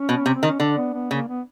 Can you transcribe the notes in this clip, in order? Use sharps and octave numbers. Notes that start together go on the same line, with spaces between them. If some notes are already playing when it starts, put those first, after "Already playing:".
Already playing: C#4
B2
C3
C4
D#3
C#4
D3 D4
B3
B3
C#3 A#3
B3